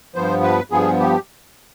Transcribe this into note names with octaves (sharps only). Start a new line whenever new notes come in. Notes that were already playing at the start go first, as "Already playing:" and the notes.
G2 F3 B3 C5
B4
G2 F3 B3 G#4
G4